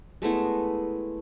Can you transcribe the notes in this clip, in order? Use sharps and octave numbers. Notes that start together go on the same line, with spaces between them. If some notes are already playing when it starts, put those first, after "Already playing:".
G#3 A3 B3 E4